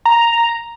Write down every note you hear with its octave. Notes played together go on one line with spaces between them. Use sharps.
A#5